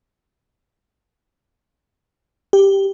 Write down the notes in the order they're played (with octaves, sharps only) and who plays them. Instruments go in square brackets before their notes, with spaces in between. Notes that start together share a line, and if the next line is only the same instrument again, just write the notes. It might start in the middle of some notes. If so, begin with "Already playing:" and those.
[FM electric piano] G4